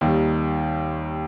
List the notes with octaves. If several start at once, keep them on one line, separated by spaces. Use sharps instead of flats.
D#2 D#3 G3